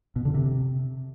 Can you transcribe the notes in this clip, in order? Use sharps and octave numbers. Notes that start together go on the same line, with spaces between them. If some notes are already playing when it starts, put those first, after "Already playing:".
B2
D3
C3